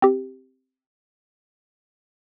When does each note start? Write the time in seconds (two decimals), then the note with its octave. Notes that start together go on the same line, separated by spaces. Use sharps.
0.02 C4 G4